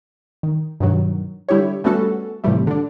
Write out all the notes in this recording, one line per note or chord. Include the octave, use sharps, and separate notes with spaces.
D#3
G2 B2 D#3 F#3
D3 G3 E4 G4 C#5
G3 A3 B3 C#4 F#4 A4
A2 C3 E3 F3 G3 A3
D3 D4